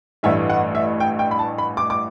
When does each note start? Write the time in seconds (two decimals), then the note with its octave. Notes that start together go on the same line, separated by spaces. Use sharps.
0.23 A1 G2 E3 A3 E5
0.50 F#5
0.75 E5
1.00 G5
1.19 G5
1.31 B5
1.39 A5
1.58 B5
1.77 D6
1.90 D6